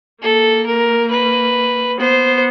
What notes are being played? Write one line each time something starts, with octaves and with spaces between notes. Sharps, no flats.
A#3 A4
A#4
B4
B3 C5